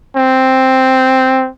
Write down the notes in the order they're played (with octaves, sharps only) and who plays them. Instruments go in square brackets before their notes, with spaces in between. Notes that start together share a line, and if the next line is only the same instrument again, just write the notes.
[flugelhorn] C4